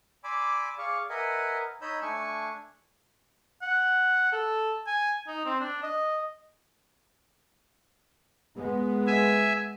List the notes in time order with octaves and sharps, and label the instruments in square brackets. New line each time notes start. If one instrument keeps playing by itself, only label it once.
[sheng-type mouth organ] D5 G#5 B5 C6 D6 E6
G#4 D5 F5 C#6
A#4 B4 D#5 E5 F#5 G#5
D#4 C#5 D#5 B5 E6 G6
A3 D4 G#5 C#6
[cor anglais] F#5
A4
G#5
D#4
C4
D4
D#5
[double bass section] G#3 B3
[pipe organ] E5 G#5